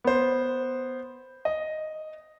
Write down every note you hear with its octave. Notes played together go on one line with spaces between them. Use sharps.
B3 C5
D#5